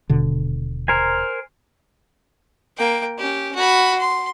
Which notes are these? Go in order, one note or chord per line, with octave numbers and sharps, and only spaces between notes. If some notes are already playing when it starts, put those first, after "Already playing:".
D#1 B2 D3
A#4 C5 G#5
A#3 G5
C#4 G4
F#4 B5
C6